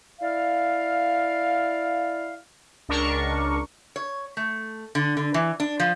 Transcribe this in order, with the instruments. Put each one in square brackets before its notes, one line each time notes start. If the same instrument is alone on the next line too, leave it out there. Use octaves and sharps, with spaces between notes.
[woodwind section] E4 D5 F5
[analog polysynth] C#2 D4 A#4 C#6
[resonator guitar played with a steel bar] C#5
A3
D3
D3
E3
D4
F3